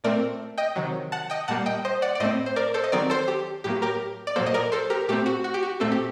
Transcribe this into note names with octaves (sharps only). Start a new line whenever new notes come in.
A#2 A3 C4 A#4 D5
D#5 G5
C3 D#3 F#3
F#5 A5
D#5 G5
A#2 G3 A#3 F#5 A5
D#5 G5
C5 D#5
D5 F#5
D5
A2 A3 C4 C5 D#5
C5
A#4 D5
A4 C5
D#5
D#3 F#3 C4 A#4 D5
A4 C5
G4
A2 F#3 A#3 G4
G4 A#4
D5
A#2 F#3 A#3 A4 C5
D#5
A#4 D5
A4 C5
G4 A#4
A#2 A3 C4 G4
F#4
F#4
G4
F#4
A#2 A3 C4 A4
G4